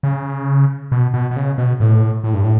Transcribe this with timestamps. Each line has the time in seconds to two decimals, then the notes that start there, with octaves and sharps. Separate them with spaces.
0.03 C#3
0.92 B2
1.14 B2
1.31 B2
1.36 C#3
1.58 B2
1.80 A2
2.24 A2
2.34 G2
2.44 A2